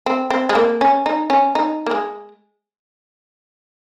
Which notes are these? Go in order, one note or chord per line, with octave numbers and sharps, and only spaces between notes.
C4
C4
G#3
A#3
C#4
D#4
C#4
D#4
A#3
G#3